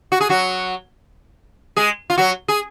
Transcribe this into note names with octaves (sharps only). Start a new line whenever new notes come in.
F#4
G#4
F#3 F#4
G#3 G#4
F4
F#3 F#4
G#4